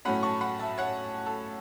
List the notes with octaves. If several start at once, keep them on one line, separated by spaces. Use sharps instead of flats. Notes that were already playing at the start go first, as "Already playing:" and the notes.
A2 F#3 A3 C#4 F#5 B5
A5 C#6
F#5 B5
E5 A5
C#5 F#5
A4